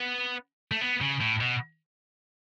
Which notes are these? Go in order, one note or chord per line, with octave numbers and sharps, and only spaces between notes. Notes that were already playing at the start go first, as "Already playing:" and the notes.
Already playing: B3
A3
B3
C#3
A2
B2